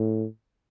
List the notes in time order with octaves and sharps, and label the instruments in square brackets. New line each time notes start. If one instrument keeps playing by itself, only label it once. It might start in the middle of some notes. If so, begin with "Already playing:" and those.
Already playing: [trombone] A2